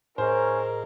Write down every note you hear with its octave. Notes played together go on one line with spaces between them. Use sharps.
A2 C#4 G#4 A#4 C5 D#5